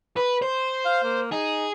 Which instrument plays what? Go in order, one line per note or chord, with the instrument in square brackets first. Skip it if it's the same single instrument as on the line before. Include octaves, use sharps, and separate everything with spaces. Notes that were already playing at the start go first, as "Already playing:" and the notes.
[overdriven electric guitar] B4
C5
[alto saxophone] F5
A#3
[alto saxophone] D#4 [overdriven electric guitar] G#4